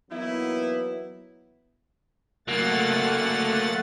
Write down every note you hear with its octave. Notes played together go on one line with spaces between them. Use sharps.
E3 F#3 A#3 B3 D#4 E4
F#3 A3 A#3 F#5 A6